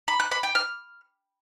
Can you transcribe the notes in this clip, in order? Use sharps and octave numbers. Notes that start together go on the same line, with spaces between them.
B5
F#6
B5
G5
F6